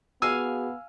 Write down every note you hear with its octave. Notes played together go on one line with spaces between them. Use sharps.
B3 F#4 G#4 F5 G#5 E6